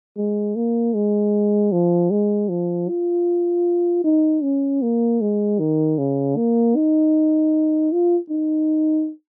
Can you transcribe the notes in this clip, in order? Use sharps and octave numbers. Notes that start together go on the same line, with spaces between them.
G#3
A#3
G#3
F3
G#3
F3
F4
D#4
C#4
A#3
G#3
D#3
C#3
A#3
D#4
F4
D#4